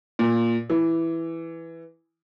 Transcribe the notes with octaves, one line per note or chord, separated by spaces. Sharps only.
A#2
E3